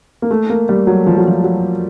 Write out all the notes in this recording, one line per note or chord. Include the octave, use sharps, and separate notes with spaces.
A#3
A3
A#3
G3
F#3
F3
F#3
F3
F#3